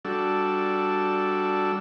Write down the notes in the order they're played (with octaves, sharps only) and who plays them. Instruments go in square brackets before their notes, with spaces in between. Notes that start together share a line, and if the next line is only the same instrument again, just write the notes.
[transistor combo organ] G3 D4 F#4 A4 E6